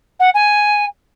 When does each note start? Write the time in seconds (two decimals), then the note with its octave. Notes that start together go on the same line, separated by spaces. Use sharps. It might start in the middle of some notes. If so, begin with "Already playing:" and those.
0.19 F#5
0.34 G#5